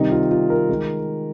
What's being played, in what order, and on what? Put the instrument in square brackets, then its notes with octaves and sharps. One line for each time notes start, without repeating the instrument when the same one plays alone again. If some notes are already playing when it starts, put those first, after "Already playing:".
Already playing: [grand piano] C3 D#3 G3 D#4
F4
F4
A#4
D#3 G#3